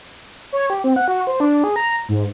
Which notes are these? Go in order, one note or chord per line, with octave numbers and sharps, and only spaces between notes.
C#5
G4
C4
F#5
F#4
C5
D4
G#4
A#5
G#2